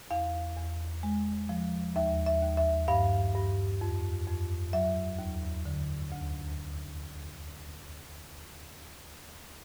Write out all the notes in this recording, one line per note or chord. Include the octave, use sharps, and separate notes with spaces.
E2 F5
E2
G#3
F3
D#2 E5
E5
D#2
E5
G2 F5
G2
F2
F2
F#3 E5
D#2
D3
D2